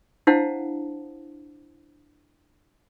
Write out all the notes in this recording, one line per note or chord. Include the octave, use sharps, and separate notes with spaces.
D4 E4 C5 F5 F#5 A5